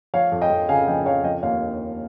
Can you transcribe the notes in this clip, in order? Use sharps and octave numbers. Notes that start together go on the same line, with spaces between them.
F3 C#5 F5
F2
D#5 G5
F2
C#3 F5 G#5
F3 D#5 G5
F2 C#5 F5
F3 D#5 G5
D#2 C#5 F5